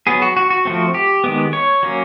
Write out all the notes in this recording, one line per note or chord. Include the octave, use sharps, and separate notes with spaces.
F#3 B3 G#4
F#4
F#4
F#4
F3 A3 C4
G4
D#3 G#3 B3
C#5
F#3 A#3 C#4